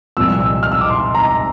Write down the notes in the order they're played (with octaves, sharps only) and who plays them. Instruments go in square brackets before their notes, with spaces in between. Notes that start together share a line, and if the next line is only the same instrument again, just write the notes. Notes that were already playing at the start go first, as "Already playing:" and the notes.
[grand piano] C2 A#2 F3 E6
E6
F6
E6
D6
C6
A#5